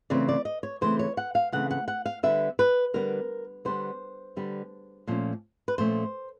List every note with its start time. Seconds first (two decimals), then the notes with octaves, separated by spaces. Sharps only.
0.10 C#3 E3 A3 C4 D5
0.28 D5
0.45 D#5
0.63 C#5
0.81 C#3 E3 A3 C4 C5
0.99 C#5
1.17 F#5
1.35 F5
1.52 C#3 E3 A3 C4 F#5
1.71 F#5
1.88 F#5
2.06 F5
2.23 D3 G3 B3 E5
2.59 B4
2.94 D3 G3 B3 A#4
3.65 D3 G3 B3 C5
4.37 D3 G3 B3
5.07 A#2 F3 A3 C#4
5.68 B4
5.78 A#2 F3 A3 C#4 C5